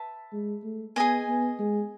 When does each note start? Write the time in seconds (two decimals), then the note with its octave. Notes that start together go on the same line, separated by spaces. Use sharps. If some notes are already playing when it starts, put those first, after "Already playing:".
Already playing: B4 E5 A5
0.33 G#3
0.64 A3
0.96 B3 G#4 D#5 G#5
1.28 B3
1.59 G#3